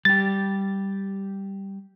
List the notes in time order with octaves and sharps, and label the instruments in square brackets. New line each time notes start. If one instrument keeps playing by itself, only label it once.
[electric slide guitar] G3 G4 [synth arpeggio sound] A6